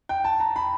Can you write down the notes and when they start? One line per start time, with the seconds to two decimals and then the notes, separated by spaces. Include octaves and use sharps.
0.09 G5
0.24 A5
0.40 A#5
0.56 B5